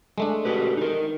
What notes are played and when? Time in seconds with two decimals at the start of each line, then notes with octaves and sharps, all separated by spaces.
0.18 G#3 A3 D4
0.45 F#4 G4 B4
0.77 D#4 A#4